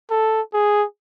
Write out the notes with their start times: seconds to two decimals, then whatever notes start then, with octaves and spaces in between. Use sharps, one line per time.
0.11 A4
0.54 G#4